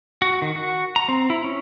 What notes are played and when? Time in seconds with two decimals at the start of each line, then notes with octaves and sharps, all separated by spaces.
0.22 F#4
0.42 D#3
0.56 F#4
0.96 A#5
1.09 C4
1.30 E4
1.44 C#4